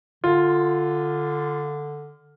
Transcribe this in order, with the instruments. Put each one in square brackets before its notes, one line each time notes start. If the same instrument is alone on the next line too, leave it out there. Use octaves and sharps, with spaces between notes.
[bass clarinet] D3 [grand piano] F4